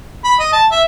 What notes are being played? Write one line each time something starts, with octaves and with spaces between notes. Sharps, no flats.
B5
D#5
A5
E5